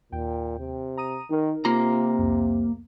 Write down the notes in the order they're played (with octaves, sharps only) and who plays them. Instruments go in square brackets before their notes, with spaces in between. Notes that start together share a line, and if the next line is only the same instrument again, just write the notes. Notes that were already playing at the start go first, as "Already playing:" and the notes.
[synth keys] D#2 G5 [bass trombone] A#2
[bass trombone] C3
[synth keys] A#5 D#6 D#7
[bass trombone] D#3 [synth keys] D#4 A#4
[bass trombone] C3 [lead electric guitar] A#3 A#5 [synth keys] F4
[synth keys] C2 F2